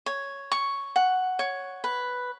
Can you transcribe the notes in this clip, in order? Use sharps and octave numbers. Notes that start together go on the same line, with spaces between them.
C#5
C#6
F#5
C#5
B4